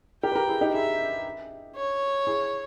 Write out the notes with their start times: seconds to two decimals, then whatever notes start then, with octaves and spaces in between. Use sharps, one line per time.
0.23 G4 A#4 G5
0.32 B4
0.35 G4 A#4
0.49 E4 G#4
0.61 D#4 G4
0.74 E4 G#4 E5
1.76 C#5
2.27 E4 G#4